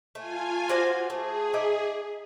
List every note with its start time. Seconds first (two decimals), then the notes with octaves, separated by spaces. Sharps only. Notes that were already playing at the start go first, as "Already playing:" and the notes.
0.15 A3 F4 G#5
0.69 F#4 C5 D5
1.10 A3 G#4
1.54 D#4 D5 E5